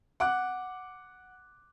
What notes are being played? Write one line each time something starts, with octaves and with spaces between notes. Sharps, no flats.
F#5 D6 F#6